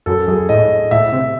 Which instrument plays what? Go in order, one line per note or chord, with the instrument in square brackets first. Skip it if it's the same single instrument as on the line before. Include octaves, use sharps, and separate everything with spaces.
[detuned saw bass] F#2 [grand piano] A4
[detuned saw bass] F#2 [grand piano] G#4
[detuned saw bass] A2 [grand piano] D#5
[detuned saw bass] A2 [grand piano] E5
[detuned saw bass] C3